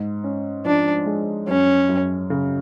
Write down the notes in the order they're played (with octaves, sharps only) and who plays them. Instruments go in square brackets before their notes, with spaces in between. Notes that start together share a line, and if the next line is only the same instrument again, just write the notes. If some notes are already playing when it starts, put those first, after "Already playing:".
Already playing: [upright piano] G#2
C#4
[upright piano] F3 [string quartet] D4
[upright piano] G#3
[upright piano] F#2 [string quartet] C#4
[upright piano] F#2
C#3